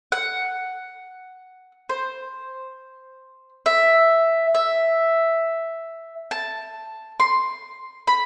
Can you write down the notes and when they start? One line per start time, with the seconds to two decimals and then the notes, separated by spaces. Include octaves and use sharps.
0.12 F#5
1.89 C5
3.66 E5
4.55 E5
6.31 A5
7.20 C6
8.07 B5